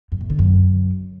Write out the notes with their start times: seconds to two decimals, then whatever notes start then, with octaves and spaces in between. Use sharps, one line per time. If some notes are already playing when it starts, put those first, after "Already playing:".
0.12 F#2
0.21 A2
0.30 D3
0.39 F#2